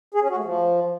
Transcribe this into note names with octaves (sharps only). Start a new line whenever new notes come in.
G#4
C#4
F#4
A3
F3